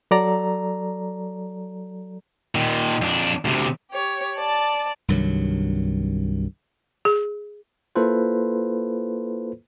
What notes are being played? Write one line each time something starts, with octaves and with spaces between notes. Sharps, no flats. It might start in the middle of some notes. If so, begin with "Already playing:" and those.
F#3 A4 D5 A#5
A#2 D#3
F2 D4
D2 C3
G4 C#5
D5 A5
C2 G2 D#3 F#3
G#4
A#3 E4 F4 A4 B4 C5